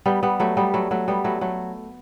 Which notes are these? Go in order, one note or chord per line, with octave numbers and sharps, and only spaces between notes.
G3 B3
G3 B3
F#3 A3
G3 B3
F#3 A3
F#3 A3
G3 B3
F#3 A3
F#3 A3